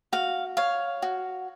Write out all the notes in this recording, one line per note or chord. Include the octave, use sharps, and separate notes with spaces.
F#4 F5
C#5 F5
F#4